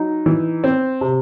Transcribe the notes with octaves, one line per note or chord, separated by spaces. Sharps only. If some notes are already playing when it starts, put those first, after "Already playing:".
Already playing: F#3 D#4
E3
C4
C3